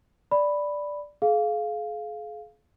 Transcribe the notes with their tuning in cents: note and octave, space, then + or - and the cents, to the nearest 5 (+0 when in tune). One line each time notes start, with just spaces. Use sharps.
D5 +0 B5 +0
G#4 +40 F5 +0